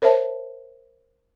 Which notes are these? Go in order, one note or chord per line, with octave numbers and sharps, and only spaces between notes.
A#4 C5 C#5 E5 A5